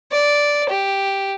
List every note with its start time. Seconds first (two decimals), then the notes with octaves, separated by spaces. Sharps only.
0.12 D5
0.70 G4